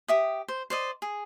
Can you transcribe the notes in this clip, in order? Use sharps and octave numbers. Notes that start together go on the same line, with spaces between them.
G4 E5 D#6
C5
C5 D5 D#5
G#4